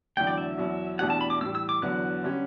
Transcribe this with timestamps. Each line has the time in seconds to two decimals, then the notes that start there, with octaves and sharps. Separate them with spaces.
0.17 E2 D3 F#3 A3 D4 G5
0.27 D5
0.38 E5
0.58 E2 B2 F#3
0.99 E2 B2 A3 D4 G4 F#5
1.10 A5
1.21 B5
1.30 D6
1.41 A2 E3 G3 E6
1.55 E6
1.69 D6
1.82 E2 D3 F#3 B3 F#6
2.24 D3 G3 C#4